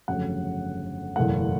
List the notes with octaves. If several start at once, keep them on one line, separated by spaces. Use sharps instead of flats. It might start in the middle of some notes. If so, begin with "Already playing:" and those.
G1 F2 C#3 F#3 A3 F#5
F#1 E2 B2 F#3 A3 F#5